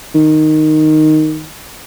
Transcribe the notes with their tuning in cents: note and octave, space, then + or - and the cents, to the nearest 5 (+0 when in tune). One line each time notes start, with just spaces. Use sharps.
D#3 -5